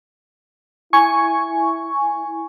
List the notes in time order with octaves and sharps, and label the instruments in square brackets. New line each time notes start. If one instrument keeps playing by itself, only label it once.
[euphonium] E4 [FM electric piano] G#5 C#6